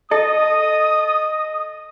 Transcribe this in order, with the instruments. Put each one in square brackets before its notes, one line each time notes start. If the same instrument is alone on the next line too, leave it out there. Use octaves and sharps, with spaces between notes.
[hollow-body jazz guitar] A4 [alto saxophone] D#5 [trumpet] D#6